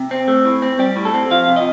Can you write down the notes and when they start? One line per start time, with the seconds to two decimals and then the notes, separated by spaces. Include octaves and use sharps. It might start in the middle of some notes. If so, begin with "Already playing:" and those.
Already playing: C3
0.11 C4
0.28 A3
0.45 A2
0.62 C4
0.79 G3 G4
0.96 A2
1.05 A4
1.14 C4
1.31 F3 F5
1.48 C3
1.56 D#5